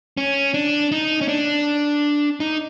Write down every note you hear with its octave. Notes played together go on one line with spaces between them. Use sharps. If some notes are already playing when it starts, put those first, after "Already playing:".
C#4
D4
D#4
C#4
D4
D#4